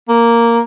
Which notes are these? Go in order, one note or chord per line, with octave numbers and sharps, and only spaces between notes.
A#3